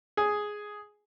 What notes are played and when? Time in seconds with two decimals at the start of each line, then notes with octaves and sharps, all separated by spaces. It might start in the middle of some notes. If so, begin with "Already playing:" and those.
0.17 G#4